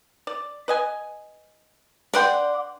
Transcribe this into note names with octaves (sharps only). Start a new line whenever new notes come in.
D5
B4 D#5 G#5
D4 B4 D5 F#5 G5 C6